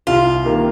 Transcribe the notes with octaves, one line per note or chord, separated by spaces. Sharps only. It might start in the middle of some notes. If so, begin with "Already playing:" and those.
C2 F4
C3 D#3 A#3